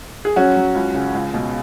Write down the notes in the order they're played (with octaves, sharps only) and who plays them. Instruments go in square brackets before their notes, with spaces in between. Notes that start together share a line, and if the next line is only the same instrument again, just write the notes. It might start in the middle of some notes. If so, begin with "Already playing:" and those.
[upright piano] G#4
F#3 C#4 F#4
F#3
C#2
C#3
C#2
B2